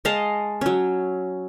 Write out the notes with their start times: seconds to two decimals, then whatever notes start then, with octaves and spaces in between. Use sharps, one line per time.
0.05 G#3 D#5 F5 A5
0.61 F#3 C#4